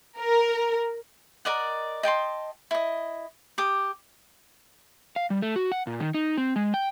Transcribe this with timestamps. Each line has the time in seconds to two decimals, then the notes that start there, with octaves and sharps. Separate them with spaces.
0.18 A#4
1.45 A#4 D5 D#5 F#5
2.03 D#5 G5 A5 C6
2.71 E4 D#5
3.58 G4 D6 D#6
5.16 F5
5.30 G3
5.42 A3
5.56 F#4
5.72 F#5
5.87 A#2
6.00 D#3
6.14 D#4
6.38 C4
6.56 G#3
6.74 G5